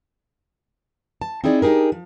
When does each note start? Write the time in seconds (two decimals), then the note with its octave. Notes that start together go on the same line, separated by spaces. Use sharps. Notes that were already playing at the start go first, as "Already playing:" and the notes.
1.22 A5
1.44 C4 D#4 E4 G#4 D5
1.62 D4 D#4 G4 G#4 A#4
1.92 F3